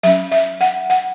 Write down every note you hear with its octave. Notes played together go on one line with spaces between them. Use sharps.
F#3 C#4 E5
E5
F#5
F#5